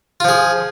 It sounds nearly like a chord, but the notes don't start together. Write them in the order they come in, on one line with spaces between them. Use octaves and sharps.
F4 F3 G#4